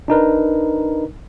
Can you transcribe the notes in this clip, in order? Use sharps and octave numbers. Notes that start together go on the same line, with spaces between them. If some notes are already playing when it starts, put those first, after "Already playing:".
D4 D#4 A#4 B4